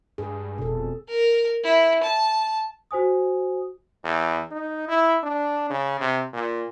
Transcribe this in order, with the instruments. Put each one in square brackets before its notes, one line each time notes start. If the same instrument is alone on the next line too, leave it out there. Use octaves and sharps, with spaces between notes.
[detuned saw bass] G2 [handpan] G#4
[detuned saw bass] F1 [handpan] B2 A4
[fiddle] A#4
E4
A5
[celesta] F#4 C5 G#5 D#6
[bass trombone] E2
D#4
E4
D4
C#3
C3
A#2